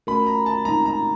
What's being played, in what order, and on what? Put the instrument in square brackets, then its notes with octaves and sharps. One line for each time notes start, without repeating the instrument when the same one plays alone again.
[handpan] A3 C#4 F#4 A#4 [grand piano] B5
[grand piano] A#5
A5
[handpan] G#3 C4 D#4 [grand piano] A#5
[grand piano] A#5